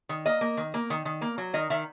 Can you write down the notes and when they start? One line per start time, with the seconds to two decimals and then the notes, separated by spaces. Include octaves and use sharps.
0.09 D#3
0.25 A#3 D#5
0.41 A#3
0.57 D#3
0.74 A#3
0.90 D#3
1.05 D#3
1.21 A#3
1.38 F#3
1.53 D#3 D#5
1.70 D#3 E5